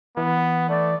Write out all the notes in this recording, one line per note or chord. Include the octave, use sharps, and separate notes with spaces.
E3 B3
A3 D5